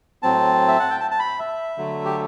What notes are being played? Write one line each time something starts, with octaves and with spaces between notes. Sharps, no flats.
A2 F#3 C4 A5
E5
F#5
G5
A5
A5
B5
E5
D3 F#3 A3
G4